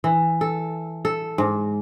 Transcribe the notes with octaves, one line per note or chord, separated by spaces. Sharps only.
E3
A4
A4
G#2